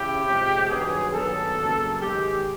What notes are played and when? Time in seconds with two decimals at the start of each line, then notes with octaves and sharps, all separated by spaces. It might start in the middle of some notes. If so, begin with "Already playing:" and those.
Already playing: C#3 E4 G4
0.25 C3 F3 G#3
0.68 G2 D#3 F#3 B3 G#4
1.13 G2 D#3 F#3 B3 A4
1.57 F#2 C#3 F#3 A#3
2.01 G#2 D#3 G#3 G4